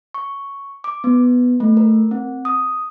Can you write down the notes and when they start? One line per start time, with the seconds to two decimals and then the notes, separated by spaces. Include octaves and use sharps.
0.14 C#6
0.84 D6
1.04 B3
1.60 A3
1.77 A#4
2.11 C4
2.45 D#6